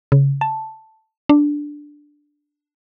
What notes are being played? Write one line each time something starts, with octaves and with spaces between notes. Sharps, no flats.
C#3
A5
D4